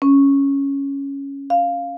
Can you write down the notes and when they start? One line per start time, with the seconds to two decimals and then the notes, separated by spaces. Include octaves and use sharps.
0.02 C#4
1.50 F5